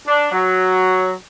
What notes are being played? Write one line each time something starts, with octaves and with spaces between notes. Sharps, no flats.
D4
F#3